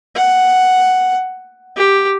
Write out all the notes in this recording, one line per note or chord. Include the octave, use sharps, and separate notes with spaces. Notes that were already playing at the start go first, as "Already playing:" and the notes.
F#5
G4